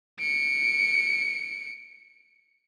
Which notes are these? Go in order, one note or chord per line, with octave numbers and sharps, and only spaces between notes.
C#7 D7